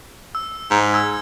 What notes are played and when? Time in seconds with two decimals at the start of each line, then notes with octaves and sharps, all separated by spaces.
0.35 E6
0.71 G#2
0.94 E6 G#6